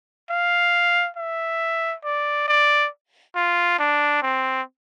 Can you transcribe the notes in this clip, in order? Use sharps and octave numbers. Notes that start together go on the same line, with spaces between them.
F5
E5
D5
D5
F4
D4
C4